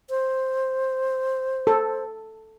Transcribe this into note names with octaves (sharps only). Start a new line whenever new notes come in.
C5
A4